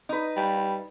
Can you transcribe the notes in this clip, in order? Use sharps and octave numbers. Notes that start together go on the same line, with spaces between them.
D#4 B4
G3